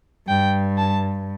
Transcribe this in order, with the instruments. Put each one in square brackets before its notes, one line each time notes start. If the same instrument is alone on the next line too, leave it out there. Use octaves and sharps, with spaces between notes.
[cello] G2 [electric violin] G5
[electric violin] A5